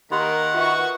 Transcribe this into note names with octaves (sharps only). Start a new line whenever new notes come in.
D#3 A#3 G4 A#4 F#5 B5 C6
F4 F#4 B4 E5 C#6